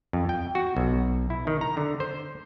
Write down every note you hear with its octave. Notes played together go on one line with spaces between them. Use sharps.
F2
G5
F#4
B1
E4
D#3
A#5
D3
C5